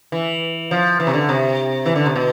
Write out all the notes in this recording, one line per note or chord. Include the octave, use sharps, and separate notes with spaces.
E3
F3
E3
C3
D3
C3
E3
D3
C3
B2